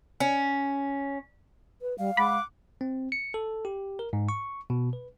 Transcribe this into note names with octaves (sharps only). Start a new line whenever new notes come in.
C#4
B4
G3 F5
G#3 F#5 B5 D6
C4
C#7
A4
G4
A#4
G#2
C#6
B2
B4